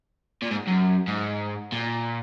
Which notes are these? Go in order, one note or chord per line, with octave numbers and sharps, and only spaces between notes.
A#2
G#2
F#2
G#2
A#2